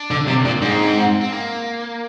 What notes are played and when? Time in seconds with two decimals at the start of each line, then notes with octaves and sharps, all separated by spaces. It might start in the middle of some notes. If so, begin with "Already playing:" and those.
Already playing: D4
0.11 D3
0.28 C3
0.45 A#2
0.62 G#2 C4
1.21 C4
1.32 A#3